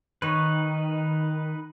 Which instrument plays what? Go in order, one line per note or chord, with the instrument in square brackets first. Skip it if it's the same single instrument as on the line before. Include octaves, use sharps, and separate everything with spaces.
[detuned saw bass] D#3 [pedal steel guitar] D#4 B4 [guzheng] C#5